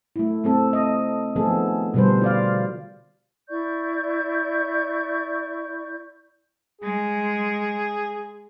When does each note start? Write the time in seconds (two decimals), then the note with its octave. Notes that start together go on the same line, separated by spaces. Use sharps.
0.16 A3 E4
0.44 A3 C4 A4
0.73 D#5
1.36 D#3 F3 A3 B3 G#4 A4
1.94 B2 D3 G3 B4 C5
2.21 F4 D5 F5
3.49 E4 D5 C#6 G6
6.81 G#3 G#4